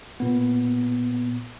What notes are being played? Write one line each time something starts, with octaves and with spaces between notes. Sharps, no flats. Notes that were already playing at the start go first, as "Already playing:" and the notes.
A#2 B3